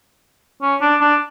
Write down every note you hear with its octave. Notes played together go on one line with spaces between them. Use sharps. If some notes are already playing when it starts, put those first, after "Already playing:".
C#4
D4
D4